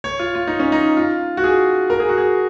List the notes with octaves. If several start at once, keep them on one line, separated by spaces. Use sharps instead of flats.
C#5
F4
F4
D#4
C#4
D#4
F4
F#4
G#4
A#4
G#4
F#4
G#4